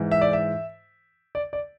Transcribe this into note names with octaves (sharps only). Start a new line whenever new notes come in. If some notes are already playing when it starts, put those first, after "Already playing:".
Already playing: G#2 E3
E5
D5
E5
D5
D5